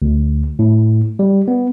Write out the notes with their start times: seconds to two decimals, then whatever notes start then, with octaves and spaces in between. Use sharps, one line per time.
0.02 D2
0.59 A2
1.19 G3
1.48 B3